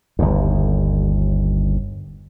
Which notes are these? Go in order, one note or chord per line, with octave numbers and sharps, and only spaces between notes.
G1 D#2